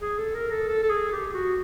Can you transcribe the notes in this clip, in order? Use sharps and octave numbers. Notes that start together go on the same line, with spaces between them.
G#4
A4
A#4
A4
A4
A4
G#4
G4
F#4